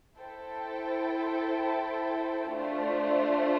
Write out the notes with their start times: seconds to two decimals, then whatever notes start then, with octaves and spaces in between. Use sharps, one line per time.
0.18 E4 A4 C5 G5
2.54 A3 D4 F4 C5